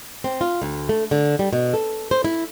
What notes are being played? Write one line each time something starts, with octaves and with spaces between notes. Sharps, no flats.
C4
F4
D2
A3
D3
G3
B2
A4
C5
E4